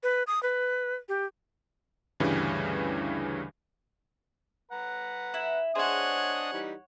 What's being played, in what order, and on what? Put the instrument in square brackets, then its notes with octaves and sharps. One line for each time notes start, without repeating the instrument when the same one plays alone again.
[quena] B4
D#6
B4
G4
[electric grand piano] D2 G2 C#3 E3 G3
[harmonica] B4 F#5 A#5
[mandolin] E4
[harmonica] D4 D#5 D#6 [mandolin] G#4 C5 [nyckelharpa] C#5 F#5
[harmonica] E3 G3 D#4